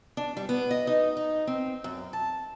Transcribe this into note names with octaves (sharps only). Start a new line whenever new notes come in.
D4
G3
B3
D#5
D#4
D#4
C4
F#2
A5